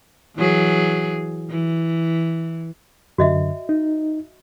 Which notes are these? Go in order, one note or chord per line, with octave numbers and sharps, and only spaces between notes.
E3 F#3 G#4
E3
F#2 D3 F#4 D#5 E5
D#4